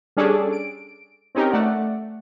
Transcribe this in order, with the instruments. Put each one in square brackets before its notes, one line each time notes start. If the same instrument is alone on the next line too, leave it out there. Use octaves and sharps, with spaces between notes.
[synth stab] G3 C#4 D4 G#4 A4 D5
D7
C4 C#4 D#4 G4 A#4
A3 D5 F#5